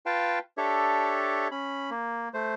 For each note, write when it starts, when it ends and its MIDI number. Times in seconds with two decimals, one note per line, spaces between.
0.06 0.39 65
0.06 0.39 71
0.06 0.39 77
0.06 0.39 79
0.06 0.39 81
0.58 1.48 62
0.58 1.48 67
0.58 1.48 69
0.58 1.48 73
0.58 1.48 76
1.51 1.90 61
1.51 1.90 83
1.90 2.29 58
2.34 2.54 57
2.34 2.54 72